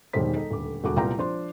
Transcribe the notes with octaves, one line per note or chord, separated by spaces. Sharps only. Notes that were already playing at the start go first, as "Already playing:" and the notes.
E1 B1 D#3 G3 C5 B6
D#4 A4
D#1 D2 D6
E1 D2 F#4 D6
C2 A#2 B3 F4 G5 A#5
F3 D4 C5 C6